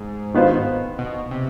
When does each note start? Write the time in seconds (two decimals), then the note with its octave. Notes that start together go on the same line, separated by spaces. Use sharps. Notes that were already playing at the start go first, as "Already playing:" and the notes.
Already playing: G#2
0.34 D#3 B3 F4 C5
0.98 B2
1.31 C3